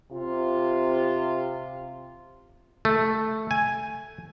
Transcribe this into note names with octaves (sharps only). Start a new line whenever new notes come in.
C3 F4
A3
G#5